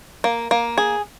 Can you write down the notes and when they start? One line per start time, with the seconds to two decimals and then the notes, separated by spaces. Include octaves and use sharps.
0.24 A#3
0.51 A#3
0.78 G#4